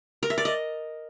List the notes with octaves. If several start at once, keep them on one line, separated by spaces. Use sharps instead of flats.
A#4
E5
D5
D#5